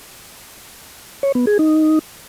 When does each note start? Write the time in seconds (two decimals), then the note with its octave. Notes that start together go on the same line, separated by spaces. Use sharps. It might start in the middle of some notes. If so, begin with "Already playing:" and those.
1.23 C#5
1.35 B3
1.47 G#4
1.59 D#4